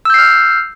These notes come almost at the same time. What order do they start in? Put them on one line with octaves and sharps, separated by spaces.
E6 G6 C7 F6